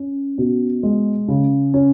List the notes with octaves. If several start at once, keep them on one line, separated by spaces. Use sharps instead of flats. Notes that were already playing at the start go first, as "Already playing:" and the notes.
Already playing: C#4
B2
G#3
C#3
C#4